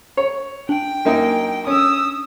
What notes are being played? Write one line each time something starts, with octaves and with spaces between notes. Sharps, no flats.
C#5
D4 G5
F#2 A#3 D#4
C#4 D#6 E6